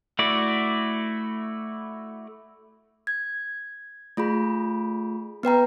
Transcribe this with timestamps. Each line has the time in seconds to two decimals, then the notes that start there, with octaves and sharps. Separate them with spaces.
0.19 A3 E4 F#4 D5
3.07 G#6
4.17 A3 F4 G#4 B5
5.43 B3 B4 G5 A#5